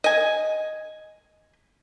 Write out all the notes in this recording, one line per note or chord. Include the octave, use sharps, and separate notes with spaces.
D#5 G#5